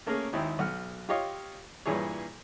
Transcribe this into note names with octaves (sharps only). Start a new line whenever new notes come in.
A3 A#3 C#4 G#4 A#4
G#1 D#2 D#4 E4 G5
B1 F#5 F6
F4 G4 C#5 D#5 F5
G2 A#2 E3 G#4 C#5